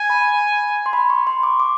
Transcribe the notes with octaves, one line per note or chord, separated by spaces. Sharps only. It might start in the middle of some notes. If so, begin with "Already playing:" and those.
Already playing: G#5
B5
C6
B5
C#6
C6
D6
D6